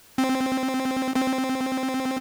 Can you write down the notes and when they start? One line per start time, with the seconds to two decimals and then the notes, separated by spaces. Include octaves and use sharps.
0.18 C4
1.16 C4